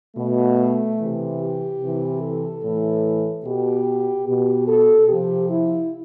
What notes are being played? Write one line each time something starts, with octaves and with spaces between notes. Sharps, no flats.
B2 A3
C3 E3
G4
C3 E3
A4
A2 E3
B2 G4
B2 G4
A4
C3 F3 G4
E4